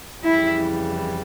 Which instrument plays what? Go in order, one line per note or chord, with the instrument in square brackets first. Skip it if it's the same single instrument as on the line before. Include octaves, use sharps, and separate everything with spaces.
[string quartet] F2 C#3 E3 G3 [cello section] E4